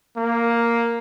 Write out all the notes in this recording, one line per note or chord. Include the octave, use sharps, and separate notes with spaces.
A#3